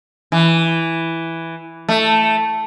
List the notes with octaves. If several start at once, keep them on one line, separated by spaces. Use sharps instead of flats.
E3
A3